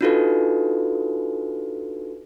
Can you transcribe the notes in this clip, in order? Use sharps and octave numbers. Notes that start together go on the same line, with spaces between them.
D4 D#4 F4 F#4 A4 B4